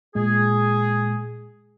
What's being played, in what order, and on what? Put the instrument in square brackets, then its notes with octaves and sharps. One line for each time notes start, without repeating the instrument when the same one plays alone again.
[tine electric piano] A#2 G#3 [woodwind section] G#4